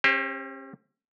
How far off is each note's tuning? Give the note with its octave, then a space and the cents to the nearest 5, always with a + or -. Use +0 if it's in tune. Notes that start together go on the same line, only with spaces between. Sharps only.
C#4 -40 G4 +25 C5 +0